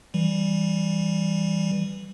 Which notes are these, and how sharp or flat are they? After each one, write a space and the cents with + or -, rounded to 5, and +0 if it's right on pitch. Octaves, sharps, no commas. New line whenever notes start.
E3 +0 G3 +0